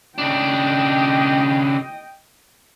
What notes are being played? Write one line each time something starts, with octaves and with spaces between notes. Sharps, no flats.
C#3 D4 D#5 G5